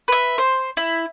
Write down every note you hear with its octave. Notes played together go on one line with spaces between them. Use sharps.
B4 E5
C5
E4